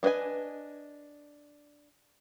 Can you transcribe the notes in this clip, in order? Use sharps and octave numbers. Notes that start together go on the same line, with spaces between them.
G3 D4 B4 D#5 G#5